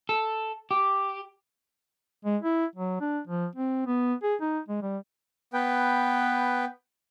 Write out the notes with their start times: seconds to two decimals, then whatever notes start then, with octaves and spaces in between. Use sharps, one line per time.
0.09 A4
0.71 G4
2.25 G#3
2.42 E4
2.76 F#3
3.01 D4
3.27 F3
3.56 C4
3.87 B3
4.23 G#4
4.41 D#4
4.69 G#3
4.82 G3
5.53 B3 B4 G5